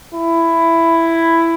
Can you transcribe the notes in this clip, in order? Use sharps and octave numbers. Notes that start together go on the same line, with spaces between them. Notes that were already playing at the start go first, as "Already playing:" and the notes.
E4